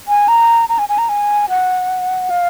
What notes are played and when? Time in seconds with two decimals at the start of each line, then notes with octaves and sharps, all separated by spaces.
0.08 G#5
0.28 A#5
0.69 A#5
0.79 G#5
0.89 G#5
0.98 A#5
1.09 G#5
1.49 F#5
2.30 F5